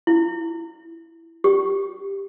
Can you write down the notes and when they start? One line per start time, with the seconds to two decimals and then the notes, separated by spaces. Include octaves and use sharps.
0.07 E4
1.44 G4